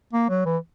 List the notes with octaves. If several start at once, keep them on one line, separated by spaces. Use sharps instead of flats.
A#3
F#3
E3